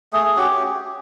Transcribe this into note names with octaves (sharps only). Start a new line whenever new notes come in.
A3 G#4
C#4 F#4 G4